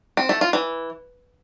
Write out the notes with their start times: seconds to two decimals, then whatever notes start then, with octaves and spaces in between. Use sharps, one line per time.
0.17 C4
0.29 A3
0.41 F4
0.53 E3